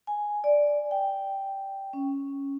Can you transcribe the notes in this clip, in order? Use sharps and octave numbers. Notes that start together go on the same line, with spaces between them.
G#5
D5
G5
C#4